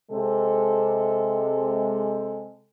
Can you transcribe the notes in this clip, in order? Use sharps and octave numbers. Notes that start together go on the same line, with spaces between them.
C3 G#3 A4